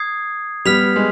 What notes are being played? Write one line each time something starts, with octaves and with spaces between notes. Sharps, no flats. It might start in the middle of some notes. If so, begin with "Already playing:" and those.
Already playing: D#6 G#6 C7
G3 B3 F6 B6 F7
G#3